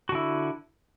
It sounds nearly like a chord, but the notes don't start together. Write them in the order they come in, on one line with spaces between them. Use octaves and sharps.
F#4 D3 E4